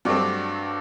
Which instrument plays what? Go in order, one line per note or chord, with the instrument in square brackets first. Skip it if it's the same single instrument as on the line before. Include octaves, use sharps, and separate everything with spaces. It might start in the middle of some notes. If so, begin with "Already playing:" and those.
[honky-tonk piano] G2 F#3 A3 C4 [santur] D4 F#4